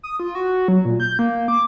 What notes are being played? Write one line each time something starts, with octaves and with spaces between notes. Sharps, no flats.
D#6
F4
F#4
F#3
A#2
G6
A#3
D6